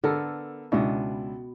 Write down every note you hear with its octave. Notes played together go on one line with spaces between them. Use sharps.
D3 B3 A4 A#4
C#2 B2 B3 D4 E4